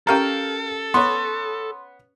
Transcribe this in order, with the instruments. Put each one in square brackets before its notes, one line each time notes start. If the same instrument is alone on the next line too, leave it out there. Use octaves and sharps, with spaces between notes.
[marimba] C#4 G4 A#5 [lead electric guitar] A4 [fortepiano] A#4 F5 G5
[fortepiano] B3 C#5 [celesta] C6